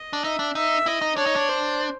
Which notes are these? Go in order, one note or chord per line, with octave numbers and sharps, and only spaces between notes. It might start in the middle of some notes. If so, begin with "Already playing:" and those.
Already playing: D#5
D4
D#4 E5
D4
D#4 E5
E4 D#5
D#4
D4 C#5
D#4
D4
C5